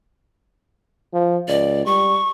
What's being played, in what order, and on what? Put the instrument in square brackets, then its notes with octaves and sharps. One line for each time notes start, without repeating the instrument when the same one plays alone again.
[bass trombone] F3
[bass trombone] C#2 [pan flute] D5
[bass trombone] G3 [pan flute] C#6